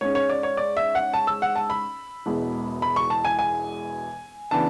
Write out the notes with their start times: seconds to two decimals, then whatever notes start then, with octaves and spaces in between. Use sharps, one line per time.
0.01 G#2 G#3 C#4 C#5
0.15 C#5
0.30 D5
0.43 C#5
0.57 D5
0.77 E5
0.95 F#5
1.14 A5
1.27 E6
1.42 F#5
1.56 A5
1.70 B5
2.26 E1 E2 B2 G#3
2.82 B5
2.96 C#6
3.10 A5
3.25 G#5
3.39 G#5
4.51 C#3 E3 B3 D4 A5